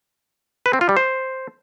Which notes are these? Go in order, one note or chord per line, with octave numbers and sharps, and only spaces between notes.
B4
C4
F4
G3
C5